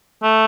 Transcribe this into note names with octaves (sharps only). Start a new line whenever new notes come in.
A3